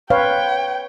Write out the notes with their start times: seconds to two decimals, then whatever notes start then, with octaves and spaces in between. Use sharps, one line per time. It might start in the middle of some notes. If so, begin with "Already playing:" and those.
0.10 B4 C#5 F5 G5